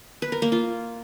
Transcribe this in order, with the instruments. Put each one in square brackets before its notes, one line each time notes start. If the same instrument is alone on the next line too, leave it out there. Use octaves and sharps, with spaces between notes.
[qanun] B4
A#4
A#3
F4